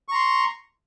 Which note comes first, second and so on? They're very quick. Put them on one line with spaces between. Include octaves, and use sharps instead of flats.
C#6 A#5 C6